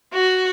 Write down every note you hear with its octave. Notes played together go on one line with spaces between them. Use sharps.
F#4